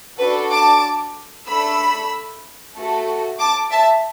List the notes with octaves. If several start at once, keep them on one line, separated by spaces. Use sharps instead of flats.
D4 F#4 A4 B4
A5 D6
A3 D4 A4 B5 E6
A3 F#4 A4
A5 D6
E5 A5